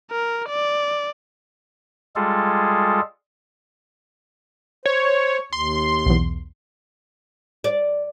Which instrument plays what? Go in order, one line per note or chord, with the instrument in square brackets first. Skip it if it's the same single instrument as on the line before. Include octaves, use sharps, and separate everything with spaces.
[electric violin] A#4
D5
[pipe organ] G3 G#3 F4 G#4 A4
[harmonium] C5 [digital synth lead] C#5
[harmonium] D#2 [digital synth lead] C6
[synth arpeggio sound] B1 E2
[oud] D5